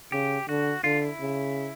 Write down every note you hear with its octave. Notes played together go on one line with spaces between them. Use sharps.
C#3 G4
D3 F#4
D3 F4
E4
C#3